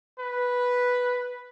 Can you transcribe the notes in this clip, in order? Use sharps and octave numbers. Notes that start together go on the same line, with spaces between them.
B4